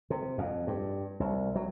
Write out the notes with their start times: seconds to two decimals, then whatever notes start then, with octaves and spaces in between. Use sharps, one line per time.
0.10 C3
0.38 F2
0.67 G2
1.20 C2
1.55 F#3